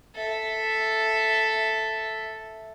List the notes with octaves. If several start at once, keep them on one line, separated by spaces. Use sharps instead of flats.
A4 E5